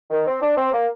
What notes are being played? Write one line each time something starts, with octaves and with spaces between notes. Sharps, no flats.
D#3
C4
D4
C4
A#3